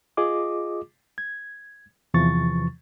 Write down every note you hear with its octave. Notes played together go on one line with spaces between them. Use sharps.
F4 G#4 D#5 D6
G#6
E2 C3 E3 F3 C#6 A6